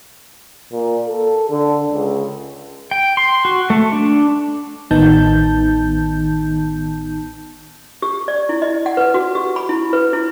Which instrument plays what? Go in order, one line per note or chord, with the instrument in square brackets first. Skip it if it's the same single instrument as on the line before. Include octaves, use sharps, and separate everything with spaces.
[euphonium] A#2
A4
D3
C#2
[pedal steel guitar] G5
C6
F#4
A3
D4
[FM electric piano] A1 D#3 B3 D#4 A5 G6
[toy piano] G4
D5
E4
D#5
F#5
B4
F#4
G4
B5
E4
B4
E4